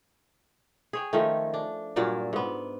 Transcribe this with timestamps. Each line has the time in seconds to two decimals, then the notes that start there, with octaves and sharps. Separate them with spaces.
0.93 G#4 C#5 G5
1.13 D#3 F3 A3 C#4
1.54 D4
1.96 G2 A#2 F#3 D5
2.33 G#2 B3